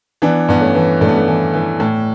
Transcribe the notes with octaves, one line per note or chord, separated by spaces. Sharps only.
E3 B3 D4
G2 B3
A3 C#4
E3
G2 A3
B3
A3
E3
E3
A2